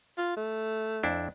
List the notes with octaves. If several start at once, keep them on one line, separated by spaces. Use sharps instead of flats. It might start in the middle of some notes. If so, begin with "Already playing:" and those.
F4
A3
F2 D4 E4